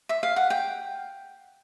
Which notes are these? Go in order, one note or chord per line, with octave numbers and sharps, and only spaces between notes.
E5
F5
F#5
G5